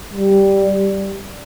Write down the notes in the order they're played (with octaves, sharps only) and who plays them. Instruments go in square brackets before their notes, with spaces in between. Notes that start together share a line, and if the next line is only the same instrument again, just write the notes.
[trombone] G3